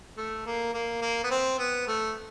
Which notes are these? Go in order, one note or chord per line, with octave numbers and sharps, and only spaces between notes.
A3
A#3
A#3
A#3
B3
C4
B3
A3